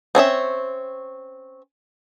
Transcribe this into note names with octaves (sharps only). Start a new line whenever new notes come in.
C4 C#4 D#4 E5